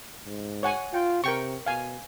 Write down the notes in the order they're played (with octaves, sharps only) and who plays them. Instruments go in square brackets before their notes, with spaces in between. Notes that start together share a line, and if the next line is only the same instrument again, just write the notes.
[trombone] G#2
[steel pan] C#5 F#5 G#5
[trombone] F4 [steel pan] G5
[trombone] C3 [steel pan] A#4 G5 C#6
[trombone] B2 [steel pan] F5 G#5